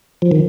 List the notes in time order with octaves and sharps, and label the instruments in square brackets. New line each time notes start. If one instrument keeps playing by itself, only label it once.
[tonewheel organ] F3
D#3